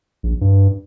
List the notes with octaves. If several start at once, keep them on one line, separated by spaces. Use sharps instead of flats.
A#1
G2